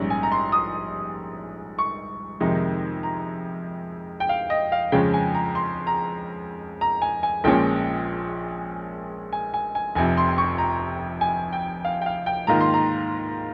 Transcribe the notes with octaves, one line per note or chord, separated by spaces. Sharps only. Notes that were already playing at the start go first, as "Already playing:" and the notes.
Already playing: A#1 G#2 G3 C#4
G#5
A#5
C6
D#6
C#6
F2 C3 D#3 G#3 D#4
A#5
G5
F5
D#5
F5
F2 C#3 F3 G#3 C#4 G5
G#5
A#5
C6
A#5
A#5
G#5
G#5
A#1 A#2 F3 G#3 C#4 G5
G#5
G#5
G#5
F1 F2 C3 G#5
C6
C#6
A#5
G#5
G5
F5
G5
F5
G5
G#2 D#3 A#3 F4 A#5
C6
A#5